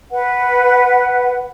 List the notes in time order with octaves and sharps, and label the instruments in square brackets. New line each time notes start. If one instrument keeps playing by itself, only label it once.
[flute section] B4 F#5